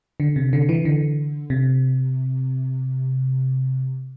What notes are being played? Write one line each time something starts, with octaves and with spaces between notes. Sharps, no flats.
D3
C3
D3
E3
D3
C3